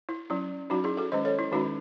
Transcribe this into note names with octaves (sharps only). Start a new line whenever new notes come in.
E4
F#3 C#4 E4
F#3 C#4 D#4 F#4
E4 G#4
F#4 A4
D#3 G#3 C#4 C5 D#5
A4 C#5
E4
D#3 G#3 C#4 D#4 F#4